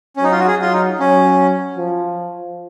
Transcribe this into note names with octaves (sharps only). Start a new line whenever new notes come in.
C#4
F#3 D#4
F4
F#4
G#4
F#3 F4
D#4
F#3 C#4
F3